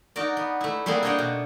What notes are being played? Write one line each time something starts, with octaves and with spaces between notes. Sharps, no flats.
D#4 F#4 A#4 D5
B3
A3 E4
G3 A3 A#3 C4 G#4 F#5
C4 D4 C#5 D#5 F#5 G5
B2